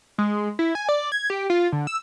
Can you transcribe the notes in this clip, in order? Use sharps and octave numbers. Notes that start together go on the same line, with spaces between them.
G#3
E4
G#5
D5
G#6
G4
F4
D3
E6